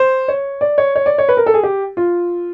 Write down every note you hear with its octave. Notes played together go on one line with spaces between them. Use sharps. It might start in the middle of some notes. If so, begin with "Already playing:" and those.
Already playing: C5
C#5
D5
C#5
C#5
D5
C#5
B4
A#4
A4
G#4
G4
F4